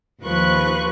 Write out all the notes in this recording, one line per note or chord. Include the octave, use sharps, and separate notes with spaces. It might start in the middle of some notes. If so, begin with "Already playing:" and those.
D#2 D#3 F3 B4 C#6 F#6